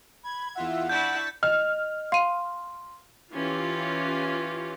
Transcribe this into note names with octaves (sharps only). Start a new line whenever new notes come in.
B5 G#6
E2 F4 E5 F#5
D4 E4 C#6 G6 A6 B6
D#5 F6
F5 C6 D#7
E3 C#4 F4 G4